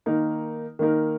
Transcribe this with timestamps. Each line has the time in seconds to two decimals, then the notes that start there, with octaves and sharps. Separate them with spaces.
0.06 D#3 A#3 D#4 A#4
0.79 D#3 A#3 D#4 A#4